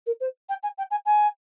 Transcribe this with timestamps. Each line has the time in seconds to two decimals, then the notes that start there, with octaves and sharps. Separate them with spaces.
0.06 A#4
0.20 C5
0.49 G5
0.63 G#5
0.78 G5
0.91 G#5
1.05 G#5